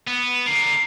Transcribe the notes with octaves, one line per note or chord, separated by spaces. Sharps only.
B3
D3 A#4 C7